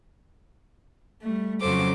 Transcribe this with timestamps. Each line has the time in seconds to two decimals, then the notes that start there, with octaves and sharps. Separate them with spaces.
1.20 G3 A3
1.60 F2 C#3 F#3 A4 C5 D6